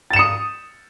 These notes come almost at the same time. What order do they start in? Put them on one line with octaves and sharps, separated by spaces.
A6 E7 C#7 D#6